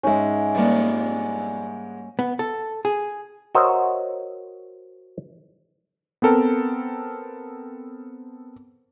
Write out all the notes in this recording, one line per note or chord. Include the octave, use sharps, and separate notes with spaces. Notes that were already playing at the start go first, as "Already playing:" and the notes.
G#2 G#3 C#4 E5
F2 G3 A#3 B3 D4
B3
A4
G#4
F#4 A#4 C5 C#5 D#5 E5
B3 C4 A4 A#4